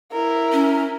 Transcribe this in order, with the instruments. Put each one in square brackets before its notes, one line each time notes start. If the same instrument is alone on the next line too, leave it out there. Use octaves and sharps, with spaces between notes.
[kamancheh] E4 A#4
[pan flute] C#4